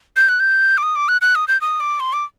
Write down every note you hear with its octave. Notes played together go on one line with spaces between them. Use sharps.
G6
F#6
G6
D6
D#6
D6
F#6
F#6
D#6
G6
D#6
D6
C6
D6